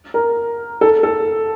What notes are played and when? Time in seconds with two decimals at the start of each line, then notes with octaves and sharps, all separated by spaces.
0.14 A#4
0.81 A4
1.03 A4